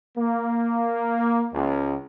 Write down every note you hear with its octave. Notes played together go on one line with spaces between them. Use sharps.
A#3
C#2